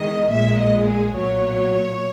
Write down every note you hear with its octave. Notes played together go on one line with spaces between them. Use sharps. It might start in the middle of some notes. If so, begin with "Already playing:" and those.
Already playing: E2 D#3 G#3 D#5
A#1 A#2 G#3 E5
D#5
G#4
B1 A#2 F#3 C#5